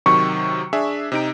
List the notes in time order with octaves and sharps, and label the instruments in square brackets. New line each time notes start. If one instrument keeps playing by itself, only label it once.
[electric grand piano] C3 D#3 F#3 [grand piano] C#6
[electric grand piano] D4 G#4 E5
C3 D#4 D7